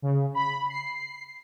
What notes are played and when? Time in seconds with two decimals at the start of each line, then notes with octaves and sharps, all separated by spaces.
0.02 C#3
0.34 B5
0.70 C7